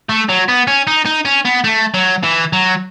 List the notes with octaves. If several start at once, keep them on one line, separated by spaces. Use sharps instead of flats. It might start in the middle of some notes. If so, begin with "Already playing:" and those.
A3
F#3
B3
C#4
D#4
D#4
C#4
B3
A3
F#3
E3
F#3